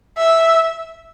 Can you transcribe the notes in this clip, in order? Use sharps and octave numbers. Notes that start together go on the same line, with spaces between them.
E5